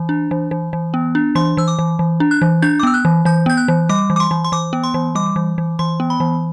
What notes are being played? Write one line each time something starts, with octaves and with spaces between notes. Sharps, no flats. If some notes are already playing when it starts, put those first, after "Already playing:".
Already playing: E3
D4
E3
E3
E3
B3
D4
E3 C6
E3 E6
D6
E3
E3
D4
F#6
E3
D4 G6
D6
B3 E6
F#6
E3
E3 G6
B3 G6
F#6
E3
G3 D6
E3
D6
C6
E3
C6
E3 D6
B3
C6
E3
G3 D6
E3
E3
E3 C6
B3
B5
E3